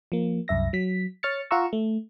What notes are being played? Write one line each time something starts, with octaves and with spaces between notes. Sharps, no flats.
F3 A#3
C2 F#2 E5 A#6
F#3 B6
C#5 F6 A6 C#7
F4 F5 F#5 A#5 C#6 E6
A3